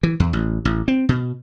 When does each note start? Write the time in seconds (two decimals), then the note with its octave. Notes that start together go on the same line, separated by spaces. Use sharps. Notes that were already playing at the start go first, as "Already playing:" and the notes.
0.03 E3
0.20 E2
0.33 A1
0.65 A1
0.88 C4
1.09 B2